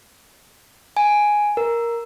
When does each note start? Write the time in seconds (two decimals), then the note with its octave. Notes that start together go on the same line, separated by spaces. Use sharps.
0.97 G#5
1.57 A#4